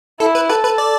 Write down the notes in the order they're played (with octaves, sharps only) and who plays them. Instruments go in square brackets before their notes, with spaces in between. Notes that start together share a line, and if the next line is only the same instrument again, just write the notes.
[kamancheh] E4 [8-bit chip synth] A4
[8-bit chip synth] B4
[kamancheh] A4 [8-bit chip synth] B4
[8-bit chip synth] B4
D5